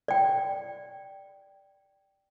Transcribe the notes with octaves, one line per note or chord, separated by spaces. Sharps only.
D5 G5